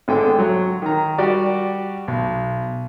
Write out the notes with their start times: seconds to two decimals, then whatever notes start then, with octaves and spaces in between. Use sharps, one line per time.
0.08 G#1 D3 G#3 G5
0.39 F#3
0.82 D#3 A#5
1.18 G3 F#4 G4 D5
2.08 B1